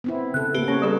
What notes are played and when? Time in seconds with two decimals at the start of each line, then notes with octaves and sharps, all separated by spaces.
0.04 B3 C4 E4
0.34 C#3 A4 F#6
0.54 A#3 B3 G4 B4
0.68 C#4 C#5
0.82 G3 G#4 A4